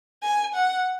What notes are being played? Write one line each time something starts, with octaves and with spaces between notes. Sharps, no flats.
G#5
F#5